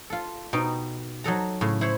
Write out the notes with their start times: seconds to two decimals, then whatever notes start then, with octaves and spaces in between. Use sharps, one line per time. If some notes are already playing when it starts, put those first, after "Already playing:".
0.10 F4 A4
0.53 B2 D#4 G5
1.24 F#3 D#4 A4 A#5
1.61 A2 C#3
1.81 E4 C5 C#5